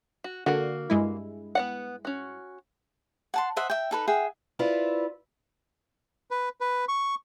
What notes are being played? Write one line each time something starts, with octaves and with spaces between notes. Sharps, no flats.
F#4
D3 A#3 F#4
G2 G#3 E4
B3 D5 F#5
C#4 F#4
F#5 A5 C6
C5 D#5 E5 F#5
E5 G5
D#4 A4 B4
G#4 E5 F#5 G5
E4 F4 B4 C5 D5 E5
B4
B4
C#6